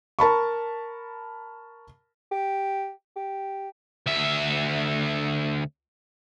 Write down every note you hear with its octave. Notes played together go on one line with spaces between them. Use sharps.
A#4 A5 B5 C#6
G4
G4
D2 E5